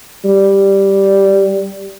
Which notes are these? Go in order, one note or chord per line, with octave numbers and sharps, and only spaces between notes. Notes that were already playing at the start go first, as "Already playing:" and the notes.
G3